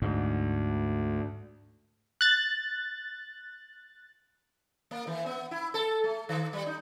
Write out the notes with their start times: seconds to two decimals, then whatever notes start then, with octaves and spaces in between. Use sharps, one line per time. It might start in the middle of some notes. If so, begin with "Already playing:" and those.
0.02 D2 G#2
2.21 F#6 A6
4.91 A#3
5.07 E3
5.26 B3
5.51 E4
5.74 A4
6.04 A3
6.29 D#3
6.53 G3
6.66 D#4